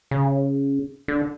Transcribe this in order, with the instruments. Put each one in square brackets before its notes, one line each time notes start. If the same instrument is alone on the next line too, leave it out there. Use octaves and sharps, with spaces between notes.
[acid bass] C#3
D3